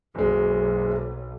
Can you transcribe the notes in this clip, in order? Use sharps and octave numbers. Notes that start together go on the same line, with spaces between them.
F#1 B1 G#3